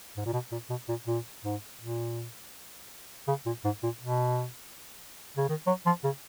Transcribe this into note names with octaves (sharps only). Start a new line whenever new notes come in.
G#2
A#2
B2
A#2
B2
A#2
A#2
G#2
A#2
C#3
A#2
G#2
A#2
B2
C#3
D#3
F#3
F3
C#3